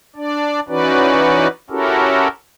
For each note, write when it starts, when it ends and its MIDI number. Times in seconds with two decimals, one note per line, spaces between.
0.16 0.60 62
0.16 0.60 74
0.68 1.47 52
0.68 1.47 61
0.68 1.47 63
0.68 1.47 66
0.68 1.47 71
0.68 1.47 74
1.70 2.28 61
1.70 2.28 64
1.70 2.28 66
1.70 2.28 67
1.70 2.28 69
1.70 2.28 70